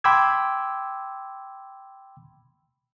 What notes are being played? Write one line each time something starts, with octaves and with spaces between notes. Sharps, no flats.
G5 B5 C6 D6 E6 G#6